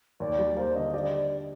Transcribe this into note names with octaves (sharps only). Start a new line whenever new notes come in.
D#2 D5
G3
A#3 C5
D3 D#5
G4 D5